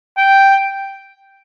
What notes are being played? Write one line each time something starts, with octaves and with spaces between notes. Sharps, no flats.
G5